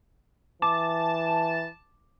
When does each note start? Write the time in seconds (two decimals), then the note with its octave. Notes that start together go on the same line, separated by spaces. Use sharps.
0.62 E3 A5 D6